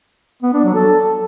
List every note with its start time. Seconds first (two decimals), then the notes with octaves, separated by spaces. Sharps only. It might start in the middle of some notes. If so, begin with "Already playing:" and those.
0.43 B3
0.53 D4
0.64 F#3
0.75 A4